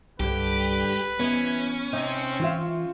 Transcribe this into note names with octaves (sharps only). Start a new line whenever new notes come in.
C2 G2 D3 G4 B4
E3 B3 C#4 D#4
C3 C4 D#4 D#5
E3 C#4 F4 E5